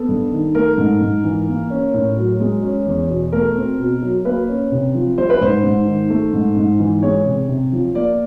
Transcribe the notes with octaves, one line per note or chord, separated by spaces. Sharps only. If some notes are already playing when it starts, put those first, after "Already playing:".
Already playing: B3 A4
G2
D#3
A3 A#4
G#2
G#2
E3
A#3
C#4
A2
F#3
G#3
C#4
E2
B2
A3 A#4
C4
B2
F#3
A#3 B4
C#4
C3
F3
G3 C5
B4
G#2 C5
G#2
D#3
A3
G#2
G#2
E3
G#3 C#5
C3
C3
F3
A#3 D5